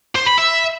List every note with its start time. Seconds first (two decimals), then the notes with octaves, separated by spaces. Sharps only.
0.15 C5
0.26 B5
0.38 E5